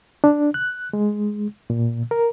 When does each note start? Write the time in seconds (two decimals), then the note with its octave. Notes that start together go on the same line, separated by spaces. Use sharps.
0.24 D4
0.54 F#6
0.93 G#3
1.70 A#2
2.11 A#4